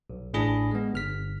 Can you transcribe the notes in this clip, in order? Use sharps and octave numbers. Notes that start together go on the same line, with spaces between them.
B1
A1 A2 D4 G#4 B5 A#6
G#3 B3
G1 F6 B6